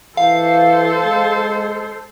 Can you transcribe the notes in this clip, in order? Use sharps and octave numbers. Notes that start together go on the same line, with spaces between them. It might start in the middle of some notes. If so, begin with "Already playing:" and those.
E3 A4 C5 F5
G#3